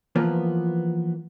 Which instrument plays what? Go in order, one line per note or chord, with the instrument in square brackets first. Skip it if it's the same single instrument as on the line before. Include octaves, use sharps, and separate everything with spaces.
[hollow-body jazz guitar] E3 F3 A#3 B3 F4